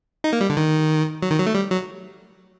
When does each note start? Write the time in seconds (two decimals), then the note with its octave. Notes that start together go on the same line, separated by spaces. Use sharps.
0.24 D#4
0.33 A#3
0.41 G3
0.49 D3
0.57 D#3
1.22 F#3
1.31 D#3
1.39 F#3
1.46 A3
1.55 G3
1.71 F#3